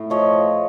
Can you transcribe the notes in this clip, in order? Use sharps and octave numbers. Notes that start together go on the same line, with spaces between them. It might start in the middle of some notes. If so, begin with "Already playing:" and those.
Already playing: A2
F3 C#5 D#5